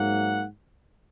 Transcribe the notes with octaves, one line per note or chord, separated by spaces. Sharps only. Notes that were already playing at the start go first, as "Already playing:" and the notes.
Already playing: G#2 F#3 A#3 F#5